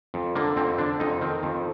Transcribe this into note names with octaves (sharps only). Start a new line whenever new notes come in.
F2
D3 A#3
F2 C4
D3 D4
F2 D#4
D#3 C4
F2